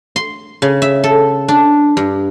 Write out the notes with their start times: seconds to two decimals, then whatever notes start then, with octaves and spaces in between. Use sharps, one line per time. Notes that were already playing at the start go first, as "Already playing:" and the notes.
0.16 C6
0.62 C#3
0.82 E5
1.04 A4
1.48 D4
1.97 G2